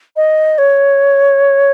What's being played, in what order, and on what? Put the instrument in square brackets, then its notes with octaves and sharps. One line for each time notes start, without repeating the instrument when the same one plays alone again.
[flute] D#5
C#5